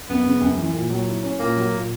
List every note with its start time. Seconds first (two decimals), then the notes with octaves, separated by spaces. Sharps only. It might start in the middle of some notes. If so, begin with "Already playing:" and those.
0.09 F#2 B3
0.25 C#3
0.41 F#2
0.58 E3
0.74 A#2
0.90 F#3
1.07 E4
1.23 C#4
1.39 A#2 A#3
1.57 F#3
1.72 A#2